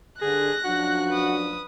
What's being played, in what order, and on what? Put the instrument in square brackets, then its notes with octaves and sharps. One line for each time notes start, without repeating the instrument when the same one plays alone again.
[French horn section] G2 D3 [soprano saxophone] G#4 [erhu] F#6 [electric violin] A#6
[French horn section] F#2 F3 D4 [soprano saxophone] F#4
[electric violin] B4 D#6